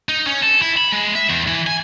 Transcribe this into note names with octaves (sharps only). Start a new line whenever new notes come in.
D#4
C#4
A4
E4
B5
G#3
E5
E2
E3
G#5